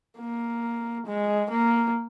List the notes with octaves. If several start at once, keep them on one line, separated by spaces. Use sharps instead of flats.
A#3
G#3
A#3